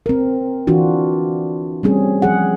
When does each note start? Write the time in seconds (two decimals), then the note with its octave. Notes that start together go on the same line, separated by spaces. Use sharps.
0.06 C4 A#4
0.67 E3 D4 F4 F#4
1.83 G3 A3 C4 C#4 G#4
2.22 F3 G#4 F#5